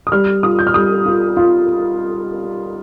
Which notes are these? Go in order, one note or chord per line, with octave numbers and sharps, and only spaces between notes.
D#6
G3 F6
F4 D#6
G6
F6
G3 D#6
F4
F4